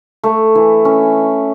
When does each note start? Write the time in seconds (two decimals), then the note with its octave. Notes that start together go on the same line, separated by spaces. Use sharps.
0.24 A3
0.55 E3
0.85 C#4